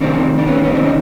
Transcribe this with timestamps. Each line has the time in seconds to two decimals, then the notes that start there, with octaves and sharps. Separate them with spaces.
0.01 F2 C3 D#3 C4 D4
0.38 D4
0.47 B3 C#4
0.63 B3 C#4
0.72 C4 D4
0.83 C#4 D#4